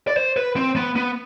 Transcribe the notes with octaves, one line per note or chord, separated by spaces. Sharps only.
D5
C5
B4
C4
B3
B3